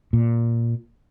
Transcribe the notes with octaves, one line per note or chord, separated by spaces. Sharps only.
A#2